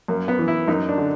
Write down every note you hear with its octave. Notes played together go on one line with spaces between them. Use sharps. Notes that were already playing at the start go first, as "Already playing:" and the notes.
F#2 A#3
B3
E3
E4
F#2 D#4
D4
D3